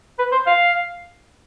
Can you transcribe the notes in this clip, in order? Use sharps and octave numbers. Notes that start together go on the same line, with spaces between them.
B4
C5
F5